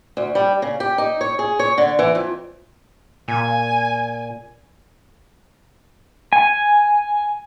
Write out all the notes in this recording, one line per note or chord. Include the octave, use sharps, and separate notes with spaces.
D2
G3
C#3
G4
D#4
C#5
G#4
C#5
D3
E3
F2
A#2 G#5
G#5